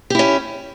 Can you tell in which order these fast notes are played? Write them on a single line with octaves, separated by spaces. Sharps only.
G4 E4 C#4